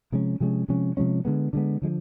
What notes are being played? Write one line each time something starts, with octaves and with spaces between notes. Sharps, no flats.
C3 F3 G#3 C#4
C3 F3 G#3 C#4
C3 F3 G#3 C#4
C3 F3 G#3 C#4
D3 F3 G#3 B3
D3 F3 G#3 B3
D3 F3 G#3